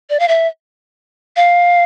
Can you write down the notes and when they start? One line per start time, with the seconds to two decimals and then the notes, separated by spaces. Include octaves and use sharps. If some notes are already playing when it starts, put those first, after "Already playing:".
0.10 D5
0.20 F5
0.28 E5
1.36 F5